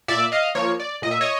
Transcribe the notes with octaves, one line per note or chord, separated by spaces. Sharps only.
A#2 D5 E5
D#5 F5
F3 A#3 C#5
D5
A#2 D#5
E5
C#5 D#5